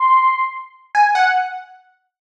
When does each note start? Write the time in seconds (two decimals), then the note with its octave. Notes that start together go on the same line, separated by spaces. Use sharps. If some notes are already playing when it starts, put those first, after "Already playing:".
Already playing: C6
0.95 G#5
1.15 F#5